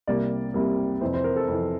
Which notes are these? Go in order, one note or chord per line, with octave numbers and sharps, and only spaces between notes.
C2 C3 G3 A#3 D5
C2 C3 G3 A#3
F2 C3 E3 C5
C5
A#4
A4
F2 C3 E3